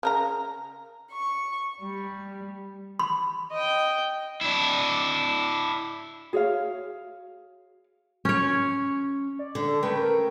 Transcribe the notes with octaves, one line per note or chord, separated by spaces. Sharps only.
C#3 A#4 A#5
C#6
G3
B5 C6
D#5 G5
D4 E4
F#4 G#4 C#5 F5
C#4 C#5
D5
D3
A4
C#3 A3 B4 G5
A#4